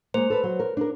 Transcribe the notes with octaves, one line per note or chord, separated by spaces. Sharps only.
G#3 A#3 C5
A4 B4
F#3
A#4
D4 A#4